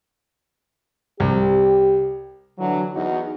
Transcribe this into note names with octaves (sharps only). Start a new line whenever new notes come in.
C2 G4
D3 E3 F#3
E2 D#4 F#4